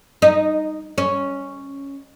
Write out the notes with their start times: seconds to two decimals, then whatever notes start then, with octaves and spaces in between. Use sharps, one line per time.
0.22 D#4
0.98 C#4